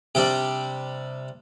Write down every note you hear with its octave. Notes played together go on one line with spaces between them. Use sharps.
C3 G3 D4 G5